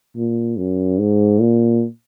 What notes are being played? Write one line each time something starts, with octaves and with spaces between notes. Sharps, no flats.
A#2
F#2
G#2
A#2